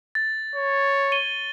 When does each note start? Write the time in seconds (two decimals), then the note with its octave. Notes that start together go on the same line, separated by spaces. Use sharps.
0.15 A6
0.55 C#5
1.12 D#7 G7